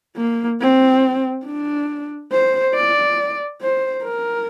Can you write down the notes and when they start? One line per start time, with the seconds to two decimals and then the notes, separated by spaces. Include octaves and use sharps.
0.16 A#3
0.60 C4
1.45 D4
2.32 C5
2.75 D5
3.61 C5
4.04 A#4